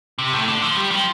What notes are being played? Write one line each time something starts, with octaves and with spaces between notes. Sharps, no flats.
C3
A2
D3
F3
G3
F3